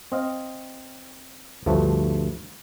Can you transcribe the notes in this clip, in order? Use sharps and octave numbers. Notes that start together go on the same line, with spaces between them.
C4 D#5 F5
D2 G2 F3 A3